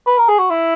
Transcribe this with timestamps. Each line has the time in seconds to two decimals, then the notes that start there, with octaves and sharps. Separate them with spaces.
0.06 B4
0.17 A#4
0.28 G#4
0.39 F#4
0.50 E4